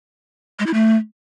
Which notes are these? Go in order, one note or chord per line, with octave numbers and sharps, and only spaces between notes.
G#3
E4
A3